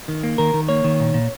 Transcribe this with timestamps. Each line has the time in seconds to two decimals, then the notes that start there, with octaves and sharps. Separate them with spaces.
0.08 D#3
0.23 A#3
0.38 D#3 A#4
0.54 D#3
0.69 A#3 C#5
0.84 D#3
1.00 A#2
1.14 A#2